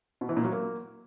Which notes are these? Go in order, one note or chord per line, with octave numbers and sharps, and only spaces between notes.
B2
E3
A#2
F#3
A#3